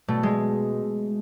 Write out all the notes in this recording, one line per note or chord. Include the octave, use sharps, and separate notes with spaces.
B2 A3
G#3